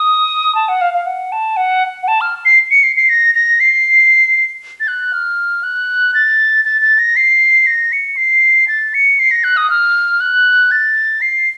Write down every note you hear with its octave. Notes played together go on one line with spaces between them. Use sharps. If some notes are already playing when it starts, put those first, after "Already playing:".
Already playing: D#6
A5
F#5
F5
F5
F#5
A5
F#5
F#5
A5
F6
C7
C#7
C7
C7
A#6
A#6
C7
A6
F#6
F6
F#6
A6
A6
A6
A#6
C7
A#6
C#7
C7
A6
C#7
C7
A#6
F#6
D#6
F6
F#6
A6
C7